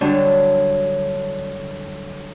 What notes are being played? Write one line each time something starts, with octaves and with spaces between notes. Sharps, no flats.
D3 F#3 G3 D4